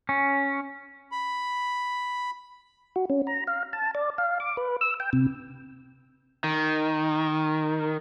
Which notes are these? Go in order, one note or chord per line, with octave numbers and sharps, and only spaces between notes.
C#4
B5
F#4
C#4
A#5
F5
A5
D5
F5
D6
B4
E6
G5
C3
D#3